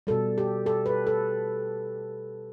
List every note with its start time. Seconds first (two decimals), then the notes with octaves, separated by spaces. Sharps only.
0.07 B2 G3 A4
0.38 G4
0.66 A4
0.86 B4
1.07 A4